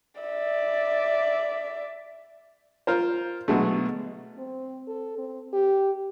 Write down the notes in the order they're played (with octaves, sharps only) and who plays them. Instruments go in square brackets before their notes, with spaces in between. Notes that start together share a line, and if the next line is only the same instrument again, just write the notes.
[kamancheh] D5 E5
[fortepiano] F4 A#4 C5
B2 D3 F#3 G#3 A3
[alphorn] C4
A4
C4
G4